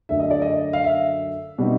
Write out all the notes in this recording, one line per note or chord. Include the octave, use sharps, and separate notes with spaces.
F#2 D3 F#3 A3 D4 E5
D#5
D5
D#5
F5
E5
B2 G3 C4 D#4